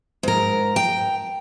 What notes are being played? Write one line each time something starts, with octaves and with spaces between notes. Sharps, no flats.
G#2 A#4
G5